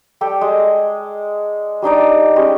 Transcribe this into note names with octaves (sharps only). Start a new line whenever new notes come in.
G3 G4 A4
G#3
G3 D4 D#4 D5
G3 G#3 C#4